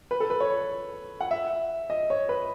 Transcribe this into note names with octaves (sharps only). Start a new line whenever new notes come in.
B4
A4
B4
C#5
F#5
E5
D#5
C#5
B4